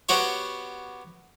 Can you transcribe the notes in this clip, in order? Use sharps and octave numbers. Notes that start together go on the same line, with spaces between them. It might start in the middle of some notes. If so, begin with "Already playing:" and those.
B3 F#4 G4 C5 C#5